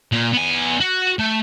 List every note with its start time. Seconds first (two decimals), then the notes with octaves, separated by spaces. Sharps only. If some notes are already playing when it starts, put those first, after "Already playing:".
0.12 A#2
0.33 B3 G#5
0.80 F#4
1.19 A3